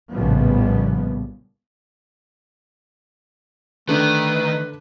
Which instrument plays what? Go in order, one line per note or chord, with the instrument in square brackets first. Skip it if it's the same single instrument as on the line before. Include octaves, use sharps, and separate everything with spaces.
[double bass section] A#1 A2 C#3 F3 G3 B3
[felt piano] D3 D4 [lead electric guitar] D#3 [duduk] A3 [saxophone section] B4